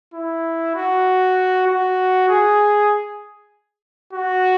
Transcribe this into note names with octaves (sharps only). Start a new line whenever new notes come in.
E4
F#4
F#4
G#4
F#4